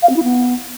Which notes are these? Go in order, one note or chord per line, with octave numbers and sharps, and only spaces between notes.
F5
C4
E4
B3